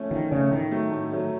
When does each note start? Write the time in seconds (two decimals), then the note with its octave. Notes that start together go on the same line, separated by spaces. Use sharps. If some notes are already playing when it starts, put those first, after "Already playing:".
Already playing: F3 A3 C#4
0.11 D#3 F3
0.31 C#3 A3 C#4
0.51 A2 D#3
0.71 F#3 A3
0.92 A2
1.12 F#3 A3